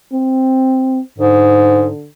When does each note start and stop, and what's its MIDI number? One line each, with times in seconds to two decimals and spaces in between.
0.13 1.01 60
1.18 1.89 44
1.18 2.07 50